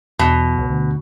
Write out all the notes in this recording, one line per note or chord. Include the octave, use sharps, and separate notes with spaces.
E2 B2
C#2
D2